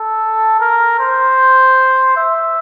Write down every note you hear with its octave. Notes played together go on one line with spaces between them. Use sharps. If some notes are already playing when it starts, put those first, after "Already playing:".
Already playing: A4
A#4
C5
E5